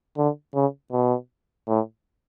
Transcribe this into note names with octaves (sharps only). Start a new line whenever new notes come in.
D3
C#3
B2
A2